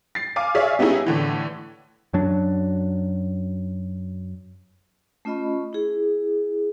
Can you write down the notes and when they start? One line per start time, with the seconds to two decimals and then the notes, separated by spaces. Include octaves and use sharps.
0.15 A6 C7
0.36 F5 G#5 D6
0.55 G#4 C#5 D5 E5 F5
0.79 G3 B3 C#4 D#4 E4 G#4
1.06 A2 D3 E3
2.13 F#2 F#3 D4
5.25 A3 C#4 F4 D#5 B5 C#6
5.73 E4 G#4